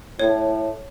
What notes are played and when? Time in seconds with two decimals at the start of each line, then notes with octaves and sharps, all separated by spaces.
0.19 A2 C#5